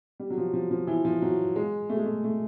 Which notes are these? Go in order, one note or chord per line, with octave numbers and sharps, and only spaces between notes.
G3
F#3
F3
F3
F3
E3
F3
F#3
G#3
A3
G#3
A3
A3